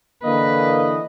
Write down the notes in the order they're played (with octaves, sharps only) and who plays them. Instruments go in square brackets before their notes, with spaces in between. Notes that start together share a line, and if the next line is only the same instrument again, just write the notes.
[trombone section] D3 A#3 [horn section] E3 D#5 [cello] B4